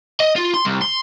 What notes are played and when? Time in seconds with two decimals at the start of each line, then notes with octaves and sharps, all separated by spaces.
0.20 D#5
0.36 F4
0.54 C6
0.65 C2
0.81 C6